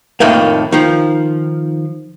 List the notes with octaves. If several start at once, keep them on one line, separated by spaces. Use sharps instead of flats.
F2 A2 D#3 A3 A#3
D#3 F3